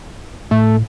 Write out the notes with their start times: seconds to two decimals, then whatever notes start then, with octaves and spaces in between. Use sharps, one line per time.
0.51 A2 A3